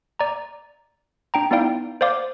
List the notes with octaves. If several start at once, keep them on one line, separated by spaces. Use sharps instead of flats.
D5 A#5
D4 G5 A#5
B3 D#4 E4 D5 F5 G5
C5 D5 F5 D6